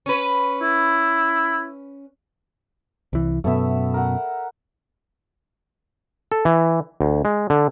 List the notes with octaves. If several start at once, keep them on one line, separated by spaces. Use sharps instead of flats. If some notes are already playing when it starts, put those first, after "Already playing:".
C#4 B4
E4
C2 E3
F#2 B2 A3 B3 E5
A#4 F#5
A4
E3
D2
G#3
D3